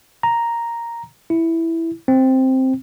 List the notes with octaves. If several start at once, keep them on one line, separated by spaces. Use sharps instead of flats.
A#5
E4
C4